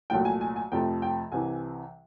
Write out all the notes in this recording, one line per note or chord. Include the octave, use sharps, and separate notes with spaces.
C2 A#2 F#3 A3 G5
G#5
G#5
G#5
F2 C3 F3 A3 G5
G5
C2 C3 E3 G#5